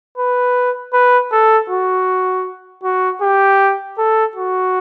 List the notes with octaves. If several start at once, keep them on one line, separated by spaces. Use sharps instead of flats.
B4
B4
A4
F#4
F#4
G4
A4
F#4